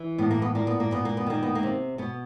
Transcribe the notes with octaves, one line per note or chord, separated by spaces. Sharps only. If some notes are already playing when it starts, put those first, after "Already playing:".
Already playing: E3
A2 B3
A#3
B3
A#2 A#3
B3
A#3
A#2 B3
A#3
B3
D#3 A#3
B3
A#3
C3
B2 B3